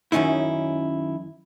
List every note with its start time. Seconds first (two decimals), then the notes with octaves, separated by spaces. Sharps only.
0.12 F#2 D#3 C#4 D#4 E4